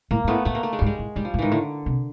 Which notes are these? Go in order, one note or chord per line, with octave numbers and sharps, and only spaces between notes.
A2 A#3
G#2
A2 A3 B3
A2 A3 B3
A#3
A3
G#3
G#2 G3
G#3
A2
G#2 G3
F3
A2
G#2 D#3 E3
A2 D3
C3